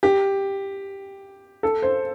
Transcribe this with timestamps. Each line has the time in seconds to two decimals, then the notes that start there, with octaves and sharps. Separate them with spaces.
0.03 G4
1.63 A4
1.82 C5